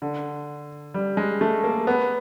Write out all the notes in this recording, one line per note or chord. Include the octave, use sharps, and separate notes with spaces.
D3
G3
G#3
A3
A#3
B3